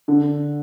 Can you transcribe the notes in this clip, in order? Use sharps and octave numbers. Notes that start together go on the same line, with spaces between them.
D3